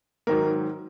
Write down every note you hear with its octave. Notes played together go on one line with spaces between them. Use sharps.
G#2 D#3 F#3 A#4